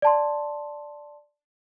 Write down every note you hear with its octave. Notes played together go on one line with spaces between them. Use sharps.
D5 A5 C6